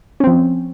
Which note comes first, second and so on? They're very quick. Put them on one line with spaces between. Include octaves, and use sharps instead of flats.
C#4 C4 F3